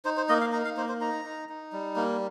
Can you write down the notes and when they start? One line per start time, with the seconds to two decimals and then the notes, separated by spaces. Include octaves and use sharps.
0.05 D#4 C5
0.17 C5
0.29 A#3 D#5
0.41 F5
0.52 D#4 A#5
0.65 F5
0.77 A#3 C5
0.89 C5
1.01 D#4 A#5
1.25 D#4
1.49 D#4
1.73 G3
1.96 A#3